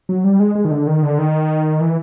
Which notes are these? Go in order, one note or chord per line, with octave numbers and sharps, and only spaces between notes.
F#3
G3
G#3
G#3
D#3
D3
D#3
D3
D#3
E3